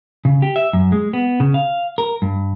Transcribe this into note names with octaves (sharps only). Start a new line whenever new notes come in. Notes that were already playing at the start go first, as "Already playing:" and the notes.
C#3
G4
E5
F#2
G#3
B3
C#3
F5
A#4
G2